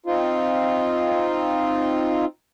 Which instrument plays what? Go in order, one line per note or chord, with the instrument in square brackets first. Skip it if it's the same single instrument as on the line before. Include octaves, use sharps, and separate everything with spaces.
[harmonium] C4 D#4 F4